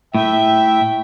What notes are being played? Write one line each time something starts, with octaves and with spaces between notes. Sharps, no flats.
A2 E5 G5